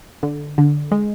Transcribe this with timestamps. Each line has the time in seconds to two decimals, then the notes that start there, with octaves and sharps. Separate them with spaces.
0.23 D3
0.58 D3
0.91 G#3